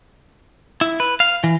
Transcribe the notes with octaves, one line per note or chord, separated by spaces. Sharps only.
E4
B4
F5
E3